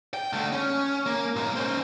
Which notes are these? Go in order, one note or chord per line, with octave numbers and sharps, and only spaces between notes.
G5
D3 A3
C#4
A#3
B1 A#3
C#4 C5